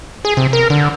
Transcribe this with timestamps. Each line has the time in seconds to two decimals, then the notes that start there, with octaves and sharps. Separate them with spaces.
0.25 G#4
0.37 C3
0.53 A#4
0.70 D3